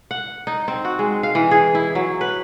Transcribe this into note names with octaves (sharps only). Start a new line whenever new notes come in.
F#5
D#4
C4
F#4
G#3
F5
E3
G#4
E4
F#3
B4